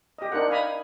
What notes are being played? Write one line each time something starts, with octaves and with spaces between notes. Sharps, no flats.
G4 D#5
D4 D#4 A#4 C5 F#5
D#4 F5 G#5 A#5 B5 D#6